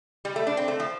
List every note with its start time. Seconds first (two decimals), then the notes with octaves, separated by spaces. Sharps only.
0.25 G3
0.36 A3
0.47 D4
0.57 C4
0.68 A3
0.80 F3